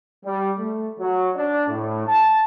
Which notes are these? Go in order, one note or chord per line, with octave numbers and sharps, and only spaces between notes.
G3
A3
F#3
D4
A2
A5